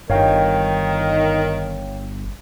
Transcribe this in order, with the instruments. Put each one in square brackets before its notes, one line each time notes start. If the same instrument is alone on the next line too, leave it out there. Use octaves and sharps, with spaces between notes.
[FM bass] G1 [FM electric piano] G2 [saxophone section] D#3 [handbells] C#5 F5 G5